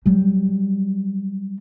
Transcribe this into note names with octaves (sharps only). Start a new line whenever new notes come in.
F#3 G3